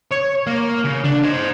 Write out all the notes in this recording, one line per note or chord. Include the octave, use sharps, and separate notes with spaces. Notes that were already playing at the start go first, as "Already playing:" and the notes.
C#5
A#3
C#3
D4
C5 D#5